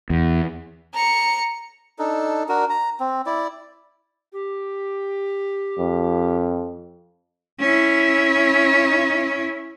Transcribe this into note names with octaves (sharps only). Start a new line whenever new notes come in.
E2
A#5 C#7
D4 D#4 A4
D4 F#4 A#4
A#5
C4
E4 D5
G4
F2
C#4 E4